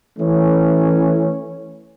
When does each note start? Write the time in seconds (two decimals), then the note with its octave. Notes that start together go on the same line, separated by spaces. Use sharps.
0.19 E3 A3 C#4